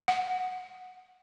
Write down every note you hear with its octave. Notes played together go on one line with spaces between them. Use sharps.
F#5